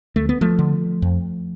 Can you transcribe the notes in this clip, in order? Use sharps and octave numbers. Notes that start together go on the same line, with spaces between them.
D2 A3
B3
F3 A3
D3
F2